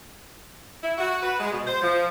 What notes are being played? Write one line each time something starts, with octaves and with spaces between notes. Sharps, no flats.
E4
F#4
B4
G#3
B2
C5
F3